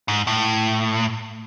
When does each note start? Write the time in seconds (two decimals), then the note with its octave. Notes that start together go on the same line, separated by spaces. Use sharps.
0.08 G#2
0.27 A2